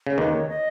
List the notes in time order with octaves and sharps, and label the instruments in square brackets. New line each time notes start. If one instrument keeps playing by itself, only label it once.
[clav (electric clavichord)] C#3
[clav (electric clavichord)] D#2 D#3 [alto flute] B4
[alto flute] C#5
D#5